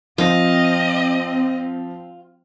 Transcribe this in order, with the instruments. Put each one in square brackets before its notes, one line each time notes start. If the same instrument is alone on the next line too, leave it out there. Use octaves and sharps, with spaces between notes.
[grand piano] F3 [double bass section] C4 [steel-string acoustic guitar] F4 [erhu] D#5